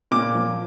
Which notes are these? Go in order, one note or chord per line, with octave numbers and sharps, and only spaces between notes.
A#2 D6
F3